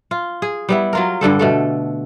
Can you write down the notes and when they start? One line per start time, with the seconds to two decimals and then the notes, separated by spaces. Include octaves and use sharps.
0.11 F4
0.42 G#4
0.69 G3 B3 E4
0.93 F#3 F4 A#4
1.21 G2 D3 G3 A4
1.39 B2 A3 A4